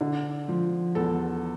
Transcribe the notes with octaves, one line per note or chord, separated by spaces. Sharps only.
D3
F3
E2 A4